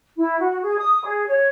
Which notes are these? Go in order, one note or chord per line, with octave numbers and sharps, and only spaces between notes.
E4
F#4
G#4
D#6
G#4
C#5